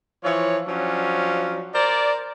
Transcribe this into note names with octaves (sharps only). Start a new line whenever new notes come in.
E3 F3 C#5
F3 F#3 C#4 D4
A#4 C5 D5